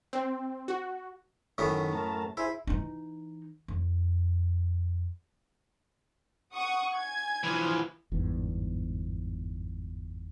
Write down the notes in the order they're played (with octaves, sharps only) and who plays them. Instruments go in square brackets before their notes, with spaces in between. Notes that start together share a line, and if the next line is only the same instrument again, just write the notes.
[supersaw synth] C4
F#4
[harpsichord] F#2 A2 B3 [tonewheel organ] D#3
[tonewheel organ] A3 A#4 A5
[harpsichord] E4 [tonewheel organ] G#4 C5
[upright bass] E3 D#4
F2
[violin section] F#5 C#6 D#6
G#5 G#6
[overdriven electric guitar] E3 F3
[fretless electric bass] G1 E2 G#2